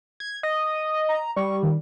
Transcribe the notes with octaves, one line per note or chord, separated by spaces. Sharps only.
G#6
D#5
A#5
G3 C#6
D#3